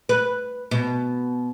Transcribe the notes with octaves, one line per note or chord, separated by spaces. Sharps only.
B4
B2